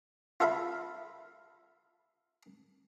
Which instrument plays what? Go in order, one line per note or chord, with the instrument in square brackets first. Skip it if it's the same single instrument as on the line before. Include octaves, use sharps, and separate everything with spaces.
[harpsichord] F4 A4 E5 F5 B5